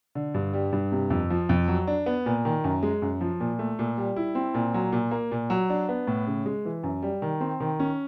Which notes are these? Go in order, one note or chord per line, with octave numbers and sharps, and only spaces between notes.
D3
G2
G3
G2
C3
F2
F3
F2
F#3
D4
B3
A#2
D#3
F#2
G#3
F#2
F3
A#2
A3
A#2
G3
E4
C4
A#2
F#3
A#2
A#3
A#2
F#3
D4
B3
A2
C#3
G#3
E3
F#2
G3
D#3
C4
D#3
C#4